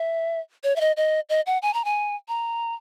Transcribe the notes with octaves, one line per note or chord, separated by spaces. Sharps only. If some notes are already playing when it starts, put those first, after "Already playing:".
Already playing: E5
C#5
E5
D#5
D#5
D#5
F#5
G#5
A#5
G#5
A#5